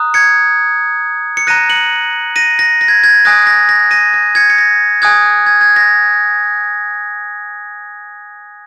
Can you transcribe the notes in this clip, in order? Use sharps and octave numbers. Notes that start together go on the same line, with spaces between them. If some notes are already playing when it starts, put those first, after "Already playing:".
Already playing: A#5 D#6 F#6
G#6 C#7
C#7
A#5 F#6 A#6 D#7
C#7 F#7
A#6 D#7
A#6
A#6
G#6
G#6
G#5 D#6 F#6 A#6
A#6
A#6
A#6 D#7
A#6
G#6 C#7
C#7
A#6
G#5 D#6 F#6 G#6
G#6
G#6
A#6